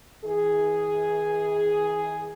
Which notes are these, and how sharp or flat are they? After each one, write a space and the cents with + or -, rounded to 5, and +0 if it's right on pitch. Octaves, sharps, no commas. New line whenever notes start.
E3 -45 G#4 +0